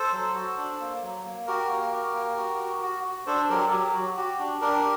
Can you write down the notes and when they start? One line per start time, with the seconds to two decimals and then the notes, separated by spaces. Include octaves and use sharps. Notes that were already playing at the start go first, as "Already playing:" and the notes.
Already playing: A4 C5
0.13 F#3
0.34 F#4
0.57 D4
0.80 A#3
1.02 F#3
1.25 A#3
1.47 F#4 G4 A#4
1.69 A#3
1.92 F#4
2.14 A#3
2.37 F#4
2.59 F#4
2.82 F#4
3.04 F#4
3.26 D4 A4 C5
3.49 F#3 G4 A#4
3.67 A4
3.72 F#3 G4
3.94 F#4
4.17 F#4 G4
4.39 D4
4.61 D4 G4 A#4